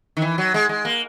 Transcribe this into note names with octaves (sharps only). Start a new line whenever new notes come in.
D#3
E3
F#3
G#3
G#3
A#3